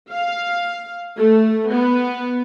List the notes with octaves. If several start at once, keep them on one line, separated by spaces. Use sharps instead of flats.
F5
A3
B3